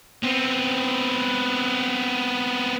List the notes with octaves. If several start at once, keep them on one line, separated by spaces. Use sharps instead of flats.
B3 C4